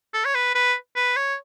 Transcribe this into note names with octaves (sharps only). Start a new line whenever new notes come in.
A4
C#5
B4
B4
B4
C#5